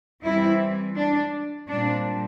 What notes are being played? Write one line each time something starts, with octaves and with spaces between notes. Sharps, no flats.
E3 G3 C4 E4
D4
A#2 G3 C4 D4